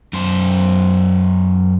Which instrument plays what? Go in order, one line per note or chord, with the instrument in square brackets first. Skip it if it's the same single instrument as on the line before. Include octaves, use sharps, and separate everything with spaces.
[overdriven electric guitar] F#2 C5